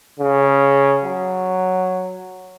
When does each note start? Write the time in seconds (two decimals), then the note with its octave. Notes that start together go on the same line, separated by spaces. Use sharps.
0.19 C#3
1.04 F#3